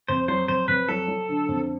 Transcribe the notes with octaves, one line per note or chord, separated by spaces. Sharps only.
F2 C5
F#3 C5
F2 C5
F2 B4
F#3 A4
F#3
D3
F2